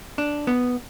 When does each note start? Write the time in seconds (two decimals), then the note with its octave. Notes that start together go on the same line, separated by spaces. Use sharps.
0.18 D4
0.47 B3